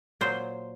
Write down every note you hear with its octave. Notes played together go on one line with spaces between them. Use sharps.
A#2 F#3 C5